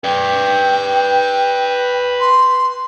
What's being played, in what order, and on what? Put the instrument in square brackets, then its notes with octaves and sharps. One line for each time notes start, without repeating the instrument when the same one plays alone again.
[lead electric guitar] B4 D5 [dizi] G5
[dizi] C6